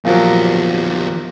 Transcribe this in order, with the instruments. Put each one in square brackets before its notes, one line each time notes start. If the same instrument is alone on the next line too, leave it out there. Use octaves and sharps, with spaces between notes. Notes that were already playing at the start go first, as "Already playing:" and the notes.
[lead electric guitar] E2 G4 [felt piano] A#2 F3 F#3